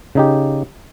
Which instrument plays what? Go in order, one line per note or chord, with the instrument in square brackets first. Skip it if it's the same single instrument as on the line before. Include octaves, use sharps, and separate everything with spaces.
[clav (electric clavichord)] C#3 D#4 G4